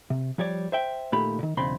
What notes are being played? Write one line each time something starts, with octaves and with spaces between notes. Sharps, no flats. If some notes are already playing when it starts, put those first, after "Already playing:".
C3
F3 G3 C#5 D5
C5 E5 G5
A#2 D#3 A3 G4 B5
A#2 D#3
B1 E2 C#3 C4 B5 C6